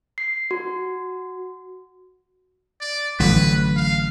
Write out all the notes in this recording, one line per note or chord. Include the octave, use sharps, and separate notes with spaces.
C7
F#4
D5
A1 D3 F#3 B4
F5